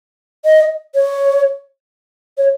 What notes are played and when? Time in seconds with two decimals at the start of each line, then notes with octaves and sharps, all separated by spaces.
0.45 D#5
0.95 C#5
2.37 C#5